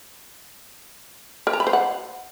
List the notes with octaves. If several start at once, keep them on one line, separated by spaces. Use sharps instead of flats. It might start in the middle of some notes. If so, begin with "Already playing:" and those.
A#4
A#5
B5
C5
F#5